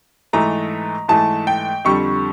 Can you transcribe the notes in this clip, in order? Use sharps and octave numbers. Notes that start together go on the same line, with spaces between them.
G#2 E3 A3 A#5
G#2 E3 A3 A5
G5
F2 D3 G3 C#6